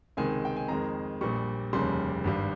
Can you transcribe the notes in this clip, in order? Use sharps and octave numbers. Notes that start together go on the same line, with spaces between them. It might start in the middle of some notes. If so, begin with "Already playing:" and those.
C#2 C3 D#3 G#3 G#5
G5
G#5
F2 D#3 G#3 A#5
A#1 A#2 G3 C#6
F1 D#2 C#3 G3 C6
G#1 G2 G3